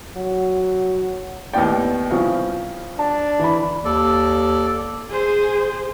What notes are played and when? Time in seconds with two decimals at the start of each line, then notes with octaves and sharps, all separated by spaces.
0.17 F#3
1.53 D#2 A2 B3 D5 G5
2.10 C2 C#3 F3
2.99 D4 A5
3.39 E3 B5
3.85 D#2 A4 D5
5.10 G#4 C5